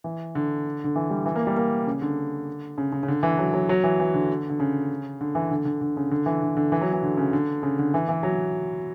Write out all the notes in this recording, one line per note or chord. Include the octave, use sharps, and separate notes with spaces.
E3
D3
D3
E3
G3
E3
A#3
G3
A#3
C#3
D3
C#3
C#3
C#3
D3
E3
F#3
F#3
F#3
E3
E3
D3
D3
C#3
D3
E3
D3
D3
D3
C#3
D3
E3
D3
D3
E3
F#3
E3
D3
C#3
D3
C#3
D3
E3
E3
F#3